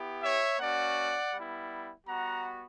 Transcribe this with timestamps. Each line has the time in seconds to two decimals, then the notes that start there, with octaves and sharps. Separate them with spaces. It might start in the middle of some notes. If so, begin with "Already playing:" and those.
Already playing: B3 E4 G4
0.22 C#5 E5
0.59 A#3 C#4 F#4 D5 F#5
1.34 G3 B3 E4
2.07 G3 B3 F#4 F#5 A#5